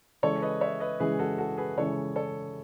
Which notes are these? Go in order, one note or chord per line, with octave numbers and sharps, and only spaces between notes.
C#3 E3 G#3 A4 C#5
B4 D#5
C#5 E5
B4 D#5
C#3 E3 G#3 G#4 B4
F#4 A4
F#4 A4
G#4 B4
C#3 E3 G#3 A4 C#5
A4 C#5